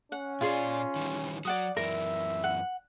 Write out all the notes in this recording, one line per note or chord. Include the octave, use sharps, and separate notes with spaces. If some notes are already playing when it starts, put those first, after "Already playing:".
C#4 F#5
A#2 F4 G#4 D5 C6
D#3 E3 G3
F#3 D5 F#5 D#6
F#2 E3 A#4 E5
F#5